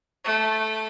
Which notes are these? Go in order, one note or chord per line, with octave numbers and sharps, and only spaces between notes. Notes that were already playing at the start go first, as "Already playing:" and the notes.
A3